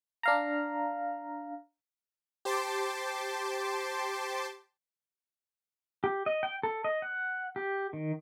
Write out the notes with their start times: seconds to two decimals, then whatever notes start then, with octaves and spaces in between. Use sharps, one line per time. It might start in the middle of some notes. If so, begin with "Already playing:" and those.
0.23 D4 F5 A#5
2.45 G4 C5 A5 C6 D6
6.04 G4
6.26 D#5
6.43 G5
6.63 A4
6.84 D#5
7.02 F#5
7.56 G4
7.93 D#3